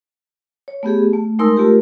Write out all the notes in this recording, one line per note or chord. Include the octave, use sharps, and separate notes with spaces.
C#5
A3 B3 G4 G#4
A3
G#3 A3 D#4 A#4 C6 E6
A3 F4 G4 A#4